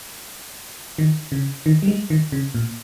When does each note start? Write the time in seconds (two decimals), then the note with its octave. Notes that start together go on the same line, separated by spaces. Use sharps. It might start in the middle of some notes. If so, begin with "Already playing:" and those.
0.98 D#3
1.32 C#3
1.66 D#3
1.82 G3
1.88 G#3
2.10 D#3
2.32 C#3
2.55 A#2